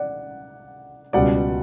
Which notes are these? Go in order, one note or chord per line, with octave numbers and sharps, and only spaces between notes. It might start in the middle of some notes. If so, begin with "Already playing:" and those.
Already playing: D5 F#5
C#2 B2 G3 D5 F#5